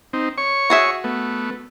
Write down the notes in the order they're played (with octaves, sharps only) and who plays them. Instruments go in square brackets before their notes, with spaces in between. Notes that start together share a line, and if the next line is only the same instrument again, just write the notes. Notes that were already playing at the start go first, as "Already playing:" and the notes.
[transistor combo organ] C4 D#4
C#5 C#6
[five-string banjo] F#4 G#4 E5
[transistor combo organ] A3 B3